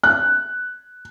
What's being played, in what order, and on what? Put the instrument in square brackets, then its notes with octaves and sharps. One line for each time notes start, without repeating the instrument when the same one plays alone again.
[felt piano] F#6